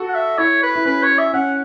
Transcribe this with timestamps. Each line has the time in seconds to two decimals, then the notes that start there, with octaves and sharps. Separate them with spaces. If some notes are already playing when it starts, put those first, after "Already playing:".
Already playing: F#4 A4
0.08 F#5
0.14 E5
0.38 E4 C#5
0.63 B4
0.76 E4
0.85 C#4 B4
1.03 C#5
1.18 E5
1.34 C#4 F#5